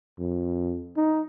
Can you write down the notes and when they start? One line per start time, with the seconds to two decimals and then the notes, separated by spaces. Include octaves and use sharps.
0.20 F2
0.97 D#4